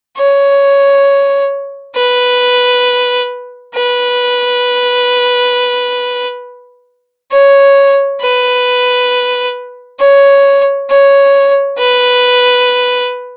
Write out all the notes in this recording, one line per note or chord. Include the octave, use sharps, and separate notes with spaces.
C#5
B4
B4
C#5
B4
C#5
C#5
B4